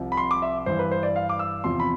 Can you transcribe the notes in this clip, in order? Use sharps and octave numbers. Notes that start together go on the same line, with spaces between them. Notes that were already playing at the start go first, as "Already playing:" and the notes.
Already playing: C2 C3 F3
B5
C6
D6
E5
G2 E3 C5
B4
C5
D5
F5
D6
E6
E2 C3 F3 C6
B5